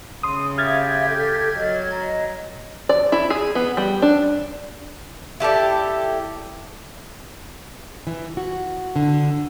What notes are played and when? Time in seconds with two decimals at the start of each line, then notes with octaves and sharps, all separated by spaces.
0.23 C#3 C6 D#6
0.58 G4 E5 F5 F6 G#6 A6
1.09 A4
1.56 F#3 D#5
1.92 A#5
2.89 D5
3.12 E4
3.30 G#4
3.55 B3
3.77 G3
4.02 D4
5.40 E4 G4 A4 D5
8.07 E3
8.37 F#4
8.96 D3